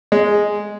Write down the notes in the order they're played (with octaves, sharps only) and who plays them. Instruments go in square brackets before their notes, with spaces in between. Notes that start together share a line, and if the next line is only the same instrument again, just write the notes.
[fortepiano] G#3